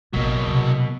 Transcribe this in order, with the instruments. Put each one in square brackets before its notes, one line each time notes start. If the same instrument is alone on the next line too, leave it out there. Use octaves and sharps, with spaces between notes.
[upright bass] A1 D#3 [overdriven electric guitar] B2 [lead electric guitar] F#3 A#3
[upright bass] C3 D#3